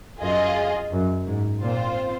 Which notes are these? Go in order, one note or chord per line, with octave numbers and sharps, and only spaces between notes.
F#2 F4 G#4 D#5
F#2
G#2
A#2 C4 F4 C5